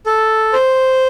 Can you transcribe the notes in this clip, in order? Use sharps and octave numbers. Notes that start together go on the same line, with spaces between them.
A4
C5